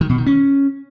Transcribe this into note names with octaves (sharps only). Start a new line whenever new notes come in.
D#3
B2
D#3
C#4